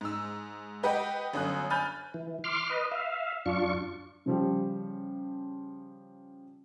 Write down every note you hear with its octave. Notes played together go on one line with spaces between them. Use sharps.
G#2 E6
G4 B4 D#5 F#5 G5
G1 F#2 D#6 F#6
G#5 B5 F6 G6 A6
E3
C6 D6 F6
B4 D#5
E5 F5
F#2 D4 F4 C#6
C#3 F3 G3